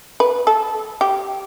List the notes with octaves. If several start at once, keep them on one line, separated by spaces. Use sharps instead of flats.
B4
A4
G4